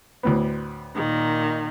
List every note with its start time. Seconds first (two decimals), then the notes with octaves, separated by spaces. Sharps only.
0.23 D2 A2 B3
0.94 A#2 D#3